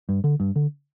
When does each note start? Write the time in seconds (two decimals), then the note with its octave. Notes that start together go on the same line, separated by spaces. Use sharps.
0.09 G2
0.24 D3
0.40 G2
0.56 D3